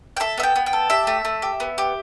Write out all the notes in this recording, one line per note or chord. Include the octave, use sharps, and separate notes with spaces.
G5
A4 E5
B3 E5
G5
B3
G5
A4
G4 E5
A3
A3
G4
B3
G4